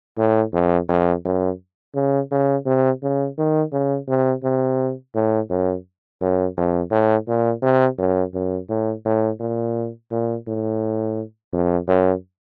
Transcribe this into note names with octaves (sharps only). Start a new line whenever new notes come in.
A2
F2
F2
F#2
C#3
C#3
C3
C#3
D#3
C#3
C3
C3
A2
F#2
F#2
F2
A2
A#2
C3
F#2
F#2
A2
A2
A#2
A#2
A2
F2
F#2